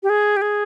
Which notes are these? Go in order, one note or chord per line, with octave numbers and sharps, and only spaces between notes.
G4
G#4
G4
G#4